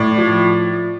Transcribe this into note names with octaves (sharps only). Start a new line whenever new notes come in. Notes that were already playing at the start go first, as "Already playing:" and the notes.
Already playing: A2 D5
F3